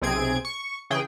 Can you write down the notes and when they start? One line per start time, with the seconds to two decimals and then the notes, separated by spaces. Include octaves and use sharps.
0.02 B1 C3 C4 G#4 G#6 D7
0.45 C#6
0.90 C#3 E3 G#4 G5